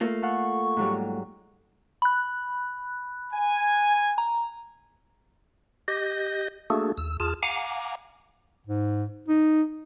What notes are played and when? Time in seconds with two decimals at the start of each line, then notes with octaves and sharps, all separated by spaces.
0.01 A3 A#3 F4
0.23 A4 F5 F#5 C#6
0.77 G#2 F#3 G3
2.02 B5 F#6
3.33 G#5
4.18 A#5
5.88 G4 D#5 G6 A#6
6.70 A3 A#3 D4 F#4 G#4 A4
6.98 D#2 E6
7.20 E2 F4 G#4 A5 F6
7.43 F5 F#5 G#5 A#5 D6
8.67 G#2
9.28 D#4